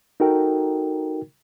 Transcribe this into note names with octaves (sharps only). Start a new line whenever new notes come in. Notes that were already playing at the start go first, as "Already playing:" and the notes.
D#4 F#4 A4 A#4 G5